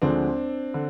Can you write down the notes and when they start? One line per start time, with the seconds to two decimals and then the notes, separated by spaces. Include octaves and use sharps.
0.02 D2 D3 F3 G#3 C4 D4
0.74 D3